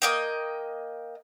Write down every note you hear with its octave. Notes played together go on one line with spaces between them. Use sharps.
A#3 D#5 G5